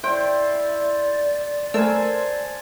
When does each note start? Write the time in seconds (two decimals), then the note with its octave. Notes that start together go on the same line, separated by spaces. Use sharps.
0.04 E4 C5 D5 G5
1.74 A3 A#4 C5 G#5 A5 E6